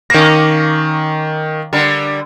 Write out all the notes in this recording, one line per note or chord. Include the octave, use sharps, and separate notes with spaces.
D#3 A#3 C#4 A#6
D3 G3 A#4